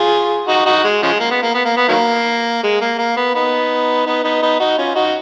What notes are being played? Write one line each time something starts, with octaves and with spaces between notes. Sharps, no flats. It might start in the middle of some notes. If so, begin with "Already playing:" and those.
Already playing: F4 G#4
D#4 F#4
D#4 F#4
G#3
C#3 F3 G#3
A#3
B3
A#3
B3
A#3
B3
D#3 F#3 A#3
G#3
A#3
A#3
B3
B3 D#4
B3 D#4
B3 D#4
B3 D#4
D#4 F#4
C#4 F4
D#4 F#4